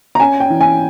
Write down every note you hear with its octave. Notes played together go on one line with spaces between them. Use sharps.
A#5
C#4 G#5
G5
E3
G#5